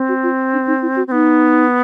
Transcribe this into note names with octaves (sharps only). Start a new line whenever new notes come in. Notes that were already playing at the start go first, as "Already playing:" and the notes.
Already playing: C4
F#4
F4
D4
D#4
E4
F#4
C4
B3 D#4